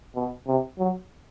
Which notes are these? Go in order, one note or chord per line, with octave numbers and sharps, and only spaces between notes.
B2
C3
F#3